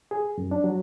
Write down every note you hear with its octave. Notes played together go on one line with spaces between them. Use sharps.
G#4
F#2
D4
F#3